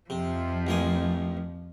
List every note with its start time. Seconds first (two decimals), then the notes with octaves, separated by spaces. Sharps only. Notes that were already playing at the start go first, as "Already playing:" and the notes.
0.10 F2 C3 F3
0.67 A1 A#3 G#5